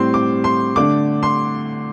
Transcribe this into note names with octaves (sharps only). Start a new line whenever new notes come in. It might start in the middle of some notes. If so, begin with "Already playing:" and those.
Already playing: A2 G3 C4 C6
D6
C6
D3 A3 D4 D6
C6